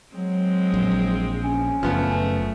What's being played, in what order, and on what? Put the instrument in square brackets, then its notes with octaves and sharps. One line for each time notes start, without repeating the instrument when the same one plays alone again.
[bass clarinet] F#3 [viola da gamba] G#3 C4
[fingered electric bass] A#1
[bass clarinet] C#4
[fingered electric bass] F#1 [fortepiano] F3 B3 [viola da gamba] A3